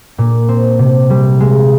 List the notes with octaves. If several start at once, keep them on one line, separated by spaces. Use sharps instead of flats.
A#2
C4
C3
G3
G#3